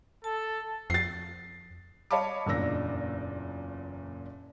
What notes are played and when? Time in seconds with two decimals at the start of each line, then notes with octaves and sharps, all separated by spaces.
0.24 A4 A5
0.90 F2 A6 C7
2.11 C#5 D#5 F5 A5 B5 D6
2.46 F#1 E2 A#2 D4 E6 A#6